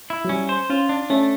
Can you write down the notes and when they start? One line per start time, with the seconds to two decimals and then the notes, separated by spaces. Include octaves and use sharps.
0.10 E4
0.25 F#3
0.29 G3 C#4
0.49 C5
0.70 C#4 F4
0.89 D4
1.10 A3 C#4